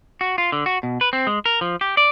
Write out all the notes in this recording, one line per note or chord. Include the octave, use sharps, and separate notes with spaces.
F#4
F4
D3
F#4
B2
B4
C4
G#3
A#4
F3
G4
D5